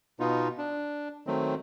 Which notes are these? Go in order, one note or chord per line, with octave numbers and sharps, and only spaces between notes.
B2 B3 D#4 F4
D4
D#3 F#3 A3 C4